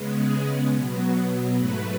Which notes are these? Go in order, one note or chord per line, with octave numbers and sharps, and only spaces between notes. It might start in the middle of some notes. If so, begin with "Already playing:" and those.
Already playing: C#3 G#3 B3
G#4
B2 F#3 B3
G#2 F#3 A3 B4